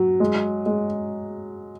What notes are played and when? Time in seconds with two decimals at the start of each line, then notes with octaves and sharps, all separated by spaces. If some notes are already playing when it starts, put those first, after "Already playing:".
Already playing: F#3
0.20 G#3
0.66 G#3